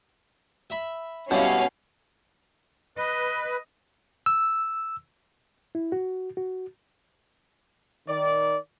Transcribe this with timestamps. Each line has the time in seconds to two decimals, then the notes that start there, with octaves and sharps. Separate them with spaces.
0.70 E5 B5
1.31 B2 G3 C#4 E4 F5
2.97 B4 D#5
4.26 E6
5.75 E4
5.92 F#4
6.37 F#4
8.08 D#3 D5